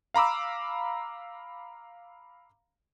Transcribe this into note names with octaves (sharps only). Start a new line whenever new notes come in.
F5 A#5 B5 D6 E6